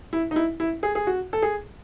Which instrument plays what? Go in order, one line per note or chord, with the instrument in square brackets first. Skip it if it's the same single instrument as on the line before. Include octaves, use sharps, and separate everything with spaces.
[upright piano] E4
D#4
E4
E4
G#4
G#4
F#4
A4
G#4